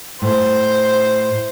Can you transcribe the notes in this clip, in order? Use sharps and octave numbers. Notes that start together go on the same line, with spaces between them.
A2 C5